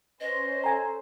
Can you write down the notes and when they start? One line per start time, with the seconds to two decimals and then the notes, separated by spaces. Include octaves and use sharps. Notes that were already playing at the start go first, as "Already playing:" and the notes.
0.21 C#4 B4 C5 D#5
0.64 A4 G#5 A#5